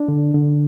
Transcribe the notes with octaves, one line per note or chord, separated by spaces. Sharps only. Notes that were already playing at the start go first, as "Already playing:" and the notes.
Already playing: D4
D3
D3